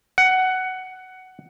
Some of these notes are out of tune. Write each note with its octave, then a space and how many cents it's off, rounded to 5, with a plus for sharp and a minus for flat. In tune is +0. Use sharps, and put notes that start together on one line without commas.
F#5 +15